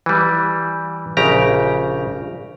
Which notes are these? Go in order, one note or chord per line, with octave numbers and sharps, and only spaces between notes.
E3 G3
A#1 C#3 G4 A#5